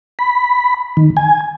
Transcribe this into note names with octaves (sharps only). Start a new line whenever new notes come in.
B5
D#3
G#5